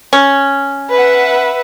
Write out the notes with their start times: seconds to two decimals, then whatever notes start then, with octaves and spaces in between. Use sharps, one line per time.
0.13 C#4
0.91 B4 E5 F#5